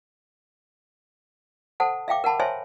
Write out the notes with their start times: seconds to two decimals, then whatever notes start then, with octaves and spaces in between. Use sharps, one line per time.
1.80 A4 C5 F#5 A5
2.08 E5 F5 G5 D6
2.24 A#4 F#5 A5 B5
2.40 C5 C#5 E5 G#5 A5 C6